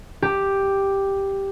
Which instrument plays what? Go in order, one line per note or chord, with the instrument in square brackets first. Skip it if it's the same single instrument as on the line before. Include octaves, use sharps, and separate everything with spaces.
[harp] G4